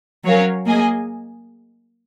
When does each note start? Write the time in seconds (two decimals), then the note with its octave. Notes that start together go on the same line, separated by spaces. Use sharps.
0.24 F#3 C#4 F#4 A#4 C#5 F5
0.66 A#3 G#4 D#5 G#5